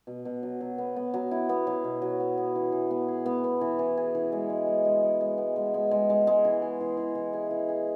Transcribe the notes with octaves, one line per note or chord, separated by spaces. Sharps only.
B2
B2
F#3
F#3
B3
B3
F#3
E4
B3
F#3
B2
F#3
B3
B3
E3
E3
B3
G#4
B3
B3
E3
E3
G#4
E3
G#3
G#3
G#3
G#3
G#3
G#3
B3
G#3
G#3
G#3
G#3
G#3
E3
G#4
E3
E3
E3
G#4
E3
G#4